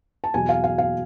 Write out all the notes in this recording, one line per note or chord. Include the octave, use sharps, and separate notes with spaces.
A5
E2 B2 F#3 G#5
F5
F5
F5